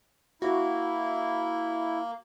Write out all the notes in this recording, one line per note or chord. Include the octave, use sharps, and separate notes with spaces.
A#3 E4 F#4